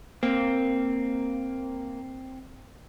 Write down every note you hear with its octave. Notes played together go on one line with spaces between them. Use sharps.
A#3 C4